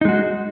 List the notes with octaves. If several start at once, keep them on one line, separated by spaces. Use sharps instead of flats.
G#3 D#4 F#4